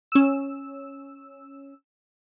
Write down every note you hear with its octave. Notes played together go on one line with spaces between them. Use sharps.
C#4 E6